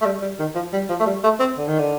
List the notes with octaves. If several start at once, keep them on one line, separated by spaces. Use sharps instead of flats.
A3
G3
G3
D#3
F3
G3
F3
A3
G3
A3
C4
D3
D#3
D3